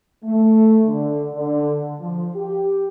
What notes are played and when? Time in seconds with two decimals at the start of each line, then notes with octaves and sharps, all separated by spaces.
0.24 A3
0.86 D3
1.35 D3
2.01 F3
2.35 G4